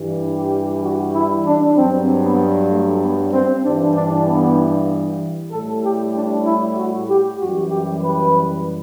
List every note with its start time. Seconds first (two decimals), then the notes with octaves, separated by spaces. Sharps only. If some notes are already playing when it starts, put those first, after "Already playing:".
Already playing: G2 E3 G3
0.37 G4
0.83 F#4
1.15 E4
1.46 D4
1.77 G2 F#3 C4
2.24 B3
2.70 A3
3.02 B3
3.33 C4
3.65 G2 E3 G3 D4
3.96 D4
4.27 B3
5.52 A2 G3 A4
5.83 G4
6.15 D4
6.45 E4
6.77 F#4
7.09 G4
7.39 F#2 E3 G3 F#4
7.70 G4
8.03 B4